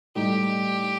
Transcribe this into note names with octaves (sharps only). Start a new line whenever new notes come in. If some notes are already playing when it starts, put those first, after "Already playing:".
A2 G3 D#4 G4